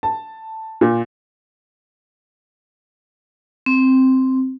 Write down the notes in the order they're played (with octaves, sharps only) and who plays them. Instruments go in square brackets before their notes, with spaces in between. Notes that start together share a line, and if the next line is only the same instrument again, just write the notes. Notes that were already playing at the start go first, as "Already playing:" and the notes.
[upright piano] A5
A#2
[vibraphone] C4